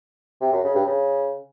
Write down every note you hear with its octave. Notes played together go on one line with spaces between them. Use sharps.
C3
F#2
C#3
G2
C#3